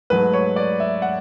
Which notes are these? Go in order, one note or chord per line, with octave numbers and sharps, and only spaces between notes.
G#2 F#3 A3 B4
C#5
D5
E5
F#5